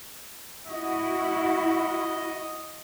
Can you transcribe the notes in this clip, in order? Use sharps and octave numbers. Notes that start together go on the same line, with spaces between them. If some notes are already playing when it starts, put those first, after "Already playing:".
E4 F#4 D#5